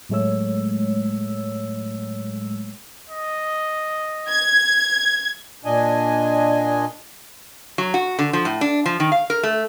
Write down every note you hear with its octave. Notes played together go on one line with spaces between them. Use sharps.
A2 F#3 G#3 A3 C#5 E6
D#5
G#6
A#2 D4 D#5 G#5
F#3
F#4
D3
F3
A2
D4
F3
D#3
F5
A#4
A3